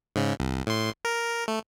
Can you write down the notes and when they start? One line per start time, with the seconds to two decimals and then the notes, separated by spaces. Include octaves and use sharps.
0.16 G#2 C#3
0.40 C2
0.67 A2 C6
1.05 A#4
1.48 A3